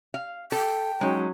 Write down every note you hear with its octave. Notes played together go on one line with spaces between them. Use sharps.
F5
A4 G5
F#3 G#3 C#4 D#4